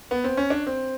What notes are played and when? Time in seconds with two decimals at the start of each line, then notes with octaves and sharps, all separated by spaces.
0.11 B3
0.24 C4
0.37 C#4
0.50 D4
0.67 C4